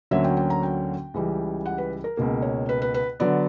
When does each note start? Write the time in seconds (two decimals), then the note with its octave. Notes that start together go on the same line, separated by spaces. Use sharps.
0.11 D2 D3 F#3 A#3 C#4 E5
0.24 G5
0.37 G5
0.50 A#5
0.63 G5
1.14 C#2 C#3 E3 G3
1.66 F#5
1.78 B4
2.04 A#4
2.17 C#2 B2 A#3
2.42 C#5
2.69 B4
2.82 B4
2.94 B4
3.20 D3 F#3 B3 D5